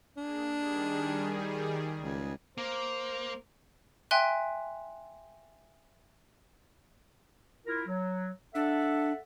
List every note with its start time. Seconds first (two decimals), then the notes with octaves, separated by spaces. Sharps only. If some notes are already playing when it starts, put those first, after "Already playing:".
0.17 A#3 D4 G#4
0.51 D#3 G3 G#4
1.99 C#2
2.58 A#3 C5
4.11 E5 G5 G#5 C6 F#6
7.67 E4 F4 A#4
7.87 F#3
8.55 D4 A4 E5 F#5